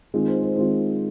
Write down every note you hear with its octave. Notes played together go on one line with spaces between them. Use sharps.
D#3 G#3 C4 F4
C5
C5
D#3 G#3 C4 F4 C5